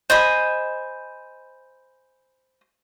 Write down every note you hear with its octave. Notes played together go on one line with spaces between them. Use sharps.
C5 D#5 G#5 B5